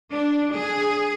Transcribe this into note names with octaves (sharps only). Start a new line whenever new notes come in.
D4
G#4